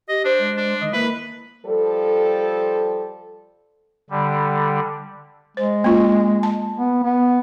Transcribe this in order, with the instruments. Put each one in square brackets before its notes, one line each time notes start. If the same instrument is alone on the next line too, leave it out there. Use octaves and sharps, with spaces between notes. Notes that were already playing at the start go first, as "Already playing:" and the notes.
[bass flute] G4 [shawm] D#5
[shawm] D4 [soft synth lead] C5
[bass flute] G#3
[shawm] D4
[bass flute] D#3 [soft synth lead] D#5
[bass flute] A#3 [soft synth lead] E4 [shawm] B4
[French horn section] F3 G3 A4
[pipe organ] D3 G3
[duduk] G#3 [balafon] C5
[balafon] A#3 C#4 F4
A5
[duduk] B3
B3